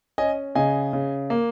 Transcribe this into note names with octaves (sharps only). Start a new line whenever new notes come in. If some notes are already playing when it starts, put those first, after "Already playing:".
C#4 D#5 G#5
C#3 D#5 G#5
C#3
A#3